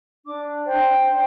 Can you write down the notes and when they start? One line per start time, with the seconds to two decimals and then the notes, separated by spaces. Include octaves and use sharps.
0.24 D4 D6
0.66 C5 G5
1.09 D4